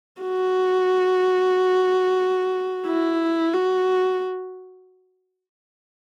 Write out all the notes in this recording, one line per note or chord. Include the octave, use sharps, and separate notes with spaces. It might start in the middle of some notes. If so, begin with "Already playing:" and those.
F#4
E4
F#4